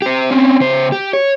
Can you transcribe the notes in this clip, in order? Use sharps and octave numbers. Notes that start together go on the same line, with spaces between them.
G4 C5
C4 C#4
C#3 C5
G4
C#5